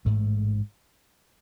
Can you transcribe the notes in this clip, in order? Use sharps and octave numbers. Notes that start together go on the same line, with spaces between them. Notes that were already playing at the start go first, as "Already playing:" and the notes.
A1 G#2 A3